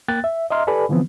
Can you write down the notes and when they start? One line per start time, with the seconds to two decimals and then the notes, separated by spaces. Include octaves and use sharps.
0.08 A#3 G5 F#6 A6
0.24 E5
0.50 D#5 E5 A#5 C6 F6
0.67 G4 A4 B4 D5 G#5 B5
0.89 D3 E3 F3 B3 C4